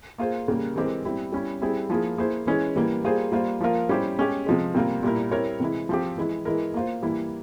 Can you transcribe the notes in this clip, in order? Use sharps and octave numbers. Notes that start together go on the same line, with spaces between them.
A#3 F4 G#4 C5
C#3 G3 A#3
E3 G#3 C4 G4 A#4
G3 C4 E4
G3 C#4 E4
G3 C4 E4 G#4
F3 A#3 E4 G#4
A#3 E4 G#4 C5
E3 G#3 C#4 E4 G#4
E3 G3 A#3
G3 A#3 F4 G#4 C5
G3 A#3 F4 C5
F3 A#3 F4 A#4
G3 C#4 E4 G4 C5
G#3 C#4 G4
C3 F3 G#3
C3 G3 A#3 F4 A#4
A#2 G3 A#3 E4 A#4
G3 C4 E4 A#4 C#5
C3 E3 G#3 E4
F3 C4 G4
E3 G#3 E4
E3 G#3 E4 A#4
A#3 F4 C5
E3 G3 A#3 E4